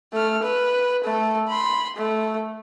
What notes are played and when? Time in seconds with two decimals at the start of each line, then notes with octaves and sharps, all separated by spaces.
0.13 A3 F6
0.43 B4
1.04 A3 A4
1.48 B5 C6
1.97 A3